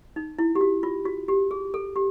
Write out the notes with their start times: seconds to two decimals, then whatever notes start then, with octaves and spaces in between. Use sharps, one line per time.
0.16 D#4
0.39 E4
0.55 G4
0.61 F#4
0.83 F4
1.06 F#4
1.28 G4
1.51 G#4
1.74 A4
1.96 G4